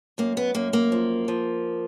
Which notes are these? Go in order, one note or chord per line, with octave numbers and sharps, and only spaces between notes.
F#2 A#3
B3
F#2 A#3
A#3
F3
F3